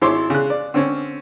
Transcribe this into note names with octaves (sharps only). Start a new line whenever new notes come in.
G#1 E4 C5 C#5 C6 D6
C#3 F#6
D5
D3 C4 C#4